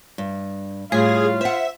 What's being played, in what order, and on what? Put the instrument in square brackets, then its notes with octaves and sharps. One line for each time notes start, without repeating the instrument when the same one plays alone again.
[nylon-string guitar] G2
[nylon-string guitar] A2 G3 [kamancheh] F4 F5 [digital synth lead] G#4
[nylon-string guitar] C5 F#5 [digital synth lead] E5